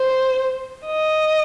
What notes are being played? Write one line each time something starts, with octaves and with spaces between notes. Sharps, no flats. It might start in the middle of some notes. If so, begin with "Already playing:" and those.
Already playing: C5
D#5